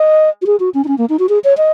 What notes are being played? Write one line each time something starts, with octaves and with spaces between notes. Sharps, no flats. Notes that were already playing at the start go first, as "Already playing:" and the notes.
Already playing: D#5
F#4
G#4
F#4
C#4
D#4
C#4
A#3
D#4
F#4
G#4
C#5
D#5